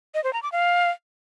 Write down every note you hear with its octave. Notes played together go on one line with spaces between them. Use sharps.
D#5
C5
A#5
D6
F5